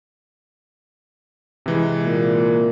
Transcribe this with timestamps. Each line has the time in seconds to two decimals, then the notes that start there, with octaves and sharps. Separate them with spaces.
1.66 C3 E3 G#3
2.04 A#2